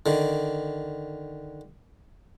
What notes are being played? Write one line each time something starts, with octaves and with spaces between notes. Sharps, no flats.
D3 D#3